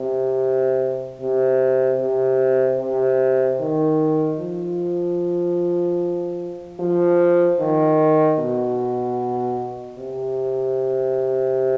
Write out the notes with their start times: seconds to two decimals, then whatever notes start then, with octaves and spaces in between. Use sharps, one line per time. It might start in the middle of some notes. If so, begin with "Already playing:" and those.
Already playing: C3
1.20 C3
2.00 C3
2.79 C3
3.60 D#3
4.39 F3
6.79 F3
7.60 D#3
8.39 B2
9.98 C3